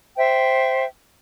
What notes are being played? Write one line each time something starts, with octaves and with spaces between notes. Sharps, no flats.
C5 E5 G5